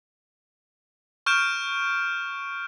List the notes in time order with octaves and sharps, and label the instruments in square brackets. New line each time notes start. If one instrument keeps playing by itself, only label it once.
[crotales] C#6 F6 G6 D7 E7